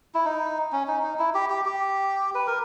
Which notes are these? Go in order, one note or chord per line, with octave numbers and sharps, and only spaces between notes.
E4
D#4
C#4
D#4
D#4
E4
G4
G4
G4
B4
A#4